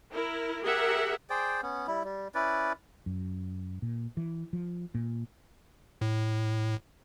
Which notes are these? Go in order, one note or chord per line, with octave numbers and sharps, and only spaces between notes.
E4 A#4
G4 G#4 A#4 E5 F#5
G#4 C5 D5 G5
B3 C#4
G3 E4
G3
C#4 E4 B4 D5
F#2
A#2
E3
F3
A#2
A2